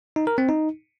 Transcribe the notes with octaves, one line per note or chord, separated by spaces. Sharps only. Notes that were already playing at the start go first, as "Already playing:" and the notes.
D#4
A#4
C4
D#4